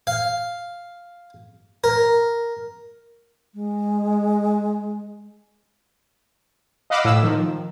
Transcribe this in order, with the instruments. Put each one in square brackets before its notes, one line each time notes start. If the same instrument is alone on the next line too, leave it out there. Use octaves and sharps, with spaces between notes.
[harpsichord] F5
A#4
[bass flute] G#3
[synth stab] D#5 F5 F#5 B5 D6 E6
A2 E6
D#3 F3